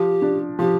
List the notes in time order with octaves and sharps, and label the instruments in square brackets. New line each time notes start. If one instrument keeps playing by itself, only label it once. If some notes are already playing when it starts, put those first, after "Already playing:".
Already playing: [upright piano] F3 [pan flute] G4
[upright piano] D4
[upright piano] F3 [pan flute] G4